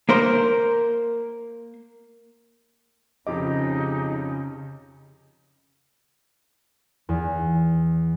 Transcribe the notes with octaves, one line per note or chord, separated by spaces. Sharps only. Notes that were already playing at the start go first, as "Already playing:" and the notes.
A#3 A#4 C5
F2 C#3 D#4 F4 G4 D#5 D6
E2